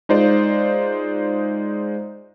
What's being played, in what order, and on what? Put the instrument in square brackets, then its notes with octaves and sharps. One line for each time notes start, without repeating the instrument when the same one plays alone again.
[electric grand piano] G#3 D#4 F4 C5 D5